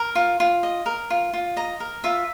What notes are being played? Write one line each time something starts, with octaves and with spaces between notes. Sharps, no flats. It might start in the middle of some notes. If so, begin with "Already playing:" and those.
Already playing: A#4
F4
F4
D#5
A#4
F4
F4
D#5 A#5
A#4
F4 E5